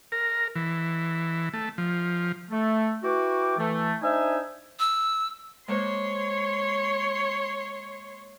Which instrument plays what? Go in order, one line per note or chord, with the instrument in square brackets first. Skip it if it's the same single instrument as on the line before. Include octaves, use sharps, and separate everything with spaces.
[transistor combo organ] A#4
E3
A3
F3
[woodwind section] A3
E4 F#4 B4 G5 C#6 D6
E3 A3
D4 D#4 C5 D#5 E5 G#5
[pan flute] E6
[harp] G#3 A#3 C5 [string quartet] C#5 C6